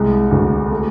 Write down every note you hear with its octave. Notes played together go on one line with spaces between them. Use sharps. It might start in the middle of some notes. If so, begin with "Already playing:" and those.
Already playing: C2 G#3
D2
A3